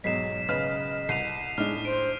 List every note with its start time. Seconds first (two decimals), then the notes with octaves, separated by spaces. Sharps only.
0.04 B1 G#2 F#3 D#5 B6 C7 E7
0.49 C#3 B4 D#5 F6
1.09 C2 C7 D#7 F7
1.58 A2 G#3 D4 D#4 F6
1.85 C5 D7